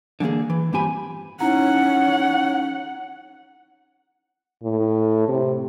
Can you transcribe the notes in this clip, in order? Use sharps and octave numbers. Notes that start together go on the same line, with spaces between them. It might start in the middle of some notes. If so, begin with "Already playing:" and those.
D3 E3 G#3 A#3 G#4
E3
G2 A#2 C4 G4 G#5 B5
C#4 D#4 E4 F#5 A#5
A2
C3